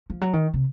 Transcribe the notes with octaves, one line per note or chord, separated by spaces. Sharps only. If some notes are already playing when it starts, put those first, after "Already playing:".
F3
F#3
D#3
C3